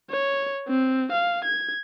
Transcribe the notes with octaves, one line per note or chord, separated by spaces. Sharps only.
C#5
C4
F5
G#6